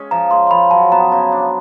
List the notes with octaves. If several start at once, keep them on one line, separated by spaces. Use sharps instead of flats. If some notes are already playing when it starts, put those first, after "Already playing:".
Already playing: G#3 C#4
F3 A#5
G#3 C6
C6
F3 B5
F#3 A5
B3 A#5
C#3 A#5
D4